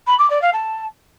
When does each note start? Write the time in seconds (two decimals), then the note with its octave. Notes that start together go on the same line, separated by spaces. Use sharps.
0.07 B5
0.18 D6
0.30 D5
0.41 F5
0.53 A5